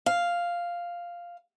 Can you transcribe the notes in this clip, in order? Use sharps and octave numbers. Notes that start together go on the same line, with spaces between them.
F5